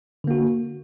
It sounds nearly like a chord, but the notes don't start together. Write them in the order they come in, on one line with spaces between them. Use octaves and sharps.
D3 A#3 F#4